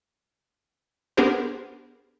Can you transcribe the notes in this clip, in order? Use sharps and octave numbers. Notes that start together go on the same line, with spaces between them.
B3 D4 G4 G#4 A#4 C5